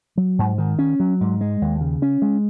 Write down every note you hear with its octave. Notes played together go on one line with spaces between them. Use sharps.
F#3
G#2
D#3
C#4
F#3
G#2
G#3
D#2
C#3
C#4
G#3